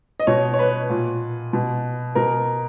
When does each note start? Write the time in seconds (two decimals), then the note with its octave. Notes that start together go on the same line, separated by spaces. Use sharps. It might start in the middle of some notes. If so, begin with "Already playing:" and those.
0.20 D#5
0.27 B2 C#5
0.54 C#5
0.59 B4
0.90 A#2
1.53 B2
2.15 B2 A#4